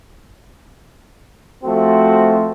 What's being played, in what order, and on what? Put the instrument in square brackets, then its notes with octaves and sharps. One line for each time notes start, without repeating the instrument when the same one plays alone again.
[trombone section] F3 A3 C4 F#4